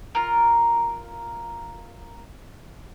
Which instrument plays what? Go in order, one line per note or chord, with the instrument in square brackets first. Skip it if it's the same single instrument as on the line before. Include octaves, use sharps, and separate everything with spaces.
[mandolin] F4 A#4